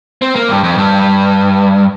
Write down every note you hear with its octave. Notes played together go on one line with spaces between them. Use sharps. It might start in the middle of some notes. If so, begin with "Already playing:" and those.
C4
A#3
G2
F2
G2